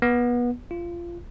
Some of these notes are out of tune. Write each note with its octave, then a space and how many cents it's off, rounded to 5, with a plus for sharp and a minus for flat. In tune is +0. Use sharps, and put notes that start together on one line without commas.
B3 -25
F4 -20